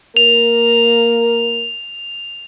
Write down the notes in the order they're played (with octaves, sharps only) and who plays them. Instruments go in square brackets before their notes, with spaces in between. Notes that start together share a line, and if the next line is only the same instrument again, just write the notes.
[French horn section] A#3 A#4 [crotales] F7